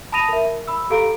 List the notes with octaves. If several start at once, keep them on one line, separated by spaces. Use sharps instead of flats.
A5 B5 D#6 A#6 D#7 F7
A#4 E5
B5 E6
G4 A4 F5 A#5 D7